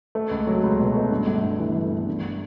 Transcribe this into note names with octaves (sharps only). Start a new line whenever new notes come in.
A3
C#2
F#3
C#2
B2
A3
G2
G1
G1
E3
G2
B3
G2